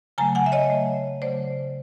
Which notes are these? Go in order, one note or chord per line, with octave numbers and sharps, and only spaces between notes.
C#3 F#3 A3 G#5 A#5
F#5 G#5
E5
C#5 D#5
C#3 F#3 A3
C#3 F#3 A3 C5 D5